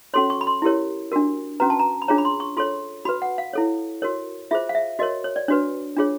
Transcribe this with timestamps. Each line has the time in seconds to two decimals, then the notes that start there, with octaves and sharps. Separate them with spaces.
0.14 C#4 F#4 A4 C#5 C6
0.30 C#6
0.41 B5
0.47 C6
0.62 E4 G4 A#4 C#5
1.12 D4 F#4 A#4
1.60 C#4 F#4 B4 A#5
1.70 A5
1.79 A#5
2.02 B5
2.08 D4 F4 G#4 C#5 A#5
2.18 B5
2.25 C6
2.40 C#6
2.57 F4 A4 C#5 C6
3.05 F#4 B5
3.09 B4
3.22 F#5
3.38 F5
3.53 E4 A4 C#5
4.02 F#4 A#4 C#5
4.51 F4 G#4 C5 E5
4.69 F5
4.75 E5
4.99 F#4 A#4 C#5 D#5
5.24 C#5
5.36 D5
5.48 D4 F#4 B4 C#5
5.97 D4 F4 G#4 C#5